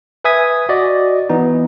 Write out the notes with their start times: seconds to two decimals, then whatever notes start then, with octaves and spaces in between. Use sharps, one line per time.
0.24 B4 E5 G#5 D#6 G#6 B6
0.69 F#4 D5 D#5
1.29 E3 B3 D#4